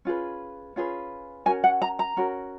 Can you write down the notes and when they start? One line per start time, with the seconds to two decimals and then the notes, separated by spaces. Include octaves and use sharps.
0.05 C#4 F4 G#4 B4
0.76 C#4 F4 G#4 B4
1.46 C#4 F#4 A#4 G#5
1.64 F#5
1.82 A#5
1.99 A#5
2.17 C#4 F#4 A#4